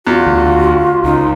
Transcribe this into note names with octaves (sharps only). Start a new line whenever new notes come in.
E2 F4 F#4
D2
C#2 D#4